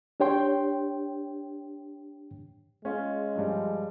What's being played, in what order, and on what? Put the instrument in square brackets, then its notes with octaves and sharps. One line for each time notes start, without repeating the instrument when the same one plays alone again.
[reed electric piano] D4 G4 C#5 G5 C6
[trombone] G#3 [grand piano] C#4 F4 G#4
[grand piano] G2 F3 G3